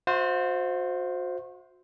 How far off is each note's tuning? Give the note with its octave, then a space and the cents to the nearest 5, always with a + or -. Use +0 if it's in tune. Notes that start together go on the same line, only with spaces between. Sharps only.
F#4 -40 C5 +0 E5 +0